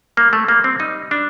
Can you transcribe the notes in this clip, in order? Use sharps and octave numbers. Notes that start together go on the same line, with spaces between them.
G3 A#3
A3
G3 A#3
C4
G3 D#4
G3 D4